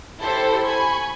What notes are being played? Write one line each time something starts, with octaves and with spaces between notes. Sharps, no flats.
E4 G4 A4 C5
G#5 B5 C#6 G#6